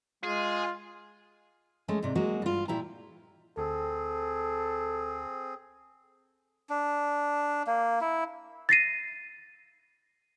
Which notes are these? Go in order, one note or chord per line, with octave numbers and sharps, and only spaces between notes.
G#3 F4 G#4
G#3 A3 C#4
G#2 C3 D5
F#3 G#3 A#3 F#4
G2 F4
A#2 E4 G4 A#5
D2 C4 G#4 A4
D4
A#3
E4
A6 A#6 C7 D#7